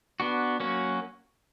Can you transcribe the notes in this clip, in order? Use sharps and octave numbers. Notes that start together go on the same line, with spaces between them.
B3 D4 F#4
F#3 A#3 C#4 F#4